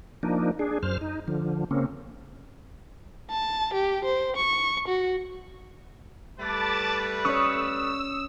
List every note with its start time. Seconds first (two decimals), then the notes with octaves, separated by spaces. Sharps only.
0.23 F3 A#3 D4 D#4
0.59 D4 G#4
0.83 F#2 C5 F6
1.01 D#4
1.28 D3 F3
1.71 C#3 A#3 C4 C#4
3.31 A5
3.74 G4
4.05 C5
4.37 C#6
4.88 F#4
6.39 G3 A3 B4 A5 D6 A6
7.25 C#4 C#5 C#6 D#6 E6